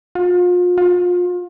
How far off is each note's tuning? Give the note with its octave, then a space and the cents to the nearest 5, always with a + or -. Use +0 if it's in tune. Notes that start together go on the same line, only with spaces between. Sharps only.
F4 +35
F4 +30